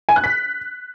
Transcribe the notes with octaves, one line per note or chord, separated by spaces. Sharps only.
G#5
F#6
B6